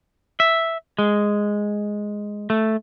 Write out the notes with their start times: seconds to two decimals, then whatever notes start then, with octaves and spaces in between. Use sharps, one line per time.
0.40 E5
0.99 G#3
2.50 A3